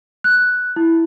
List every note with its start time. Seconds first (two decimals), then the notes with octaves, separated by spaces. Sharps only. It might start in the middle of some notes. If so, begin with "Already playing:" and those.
0.24 F#6
0.76 E4